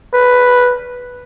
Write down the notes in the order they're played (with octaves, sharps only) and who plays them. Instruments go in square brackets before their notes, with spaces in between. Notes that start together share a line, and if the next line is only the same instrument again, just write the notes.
[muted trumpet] B4